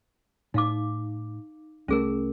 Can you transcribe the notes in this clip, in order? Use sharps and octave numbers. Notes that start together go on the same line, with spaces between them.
A2 D#4 F5 D6
C2 A3 C#4 G#4 A#4